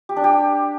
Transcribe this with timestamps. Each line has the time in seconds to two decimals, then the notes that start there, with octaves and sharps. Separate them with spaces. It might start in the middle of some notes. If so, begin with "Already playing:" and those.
0.09 G4
0.16 D4
0.24 G4